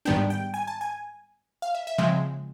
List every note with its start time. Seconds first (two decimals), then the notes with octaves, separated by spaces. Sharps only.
0.05 G#2 D#3 G3 B3 D4 G5
0.30 G5
0.54 G#5
0.67 A5
0.81 G#5
1.62 F5
1.75 E5
1.87 E5
1.98 C#3 F3 G#3 C4 E5